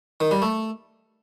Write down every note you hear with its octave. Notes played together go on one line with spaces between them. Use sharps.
D#3
G3
A3